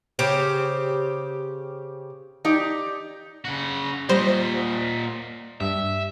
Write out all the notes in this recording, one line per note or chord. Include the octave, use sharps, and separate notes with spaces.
C#3 G4 C5
D#4 G4 D5
C#3 F#4
A#2 G3 C5 D#5
G2 E5